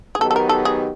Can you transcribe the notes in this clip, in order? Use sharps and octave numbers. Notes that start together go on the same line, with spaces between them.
G#4
D#3 F#3 B3 D#4 G4 A4
A4
A#4
A4
G#4